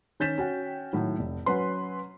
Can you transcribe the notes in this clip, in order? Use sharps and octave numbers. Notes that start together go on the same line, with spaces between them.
D#3 C#4 G6 A6 B6 E7
C#4 F#4 G5
A2 D#3 F#3
F1
F#3 C#4 B4 C6